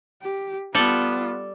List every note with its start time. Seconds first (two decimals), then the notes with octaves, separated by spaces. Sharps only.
0.23 G4
0.75 G3 B3 F4 A4